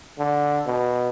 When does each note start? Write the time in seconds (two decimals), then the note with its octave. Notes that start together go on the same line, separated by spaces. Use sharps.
0.19 D3
0.67 B2